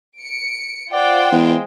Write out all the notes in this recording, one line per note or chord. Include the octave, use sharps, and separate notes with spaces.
C#7 D7
F4 C5 D5 F#5 G5
E2 G#3